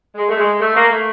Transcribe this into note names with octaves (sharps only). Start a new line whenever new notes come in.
G#3
A3
G#3
A3
A#3
A3